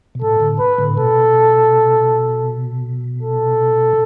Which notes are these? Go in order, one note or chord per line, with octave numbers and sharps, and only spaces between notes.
B2
A2 A4
A2 D3
B4
A2 D3
B2 A4
A4